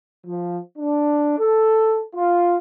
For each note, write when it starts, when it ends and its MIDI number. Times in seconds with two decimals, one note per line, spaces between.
0.26 0.58 53
0.77 1.37 62
1.38 2.02 69
2.15 2.56 65